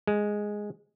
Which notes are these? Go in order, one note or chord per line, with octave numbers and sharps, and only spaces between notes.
G#3